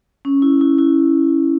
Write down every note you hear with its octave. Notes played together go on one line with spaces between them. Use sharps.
C#4
E4
E4
E4